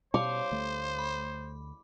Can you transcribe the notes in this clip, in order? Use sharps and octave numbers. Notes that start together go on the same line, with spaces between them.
B2 C5 C#5 F5 D6
D2 A3
B5